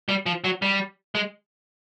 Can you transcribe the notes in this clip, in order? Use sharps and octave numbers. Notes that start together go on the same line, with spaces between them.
G3
F3
F#3
G3
G#3